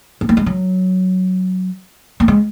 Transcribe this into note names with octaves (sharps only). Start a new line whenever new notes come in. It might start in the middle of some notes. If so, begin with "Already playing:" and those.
B3
A#3
G#3
F#3
A#3
G#3